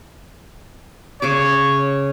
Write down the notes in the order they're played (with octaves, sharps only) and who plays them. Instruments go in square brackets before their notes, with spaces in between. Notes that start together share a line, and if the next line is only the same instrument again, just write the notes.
[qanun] C#3 G#4 D6 [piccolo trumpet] C#5